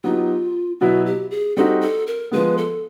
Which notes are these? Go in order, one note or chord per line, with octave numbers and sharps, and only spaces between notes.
F#3 B3 D#4 F4 G4
B2 F#3 B3 E4 F#4
G4
G#4
G3 C4 D#4 F#4 A4
A4
A#4
F3 G#3 B3 B4
A4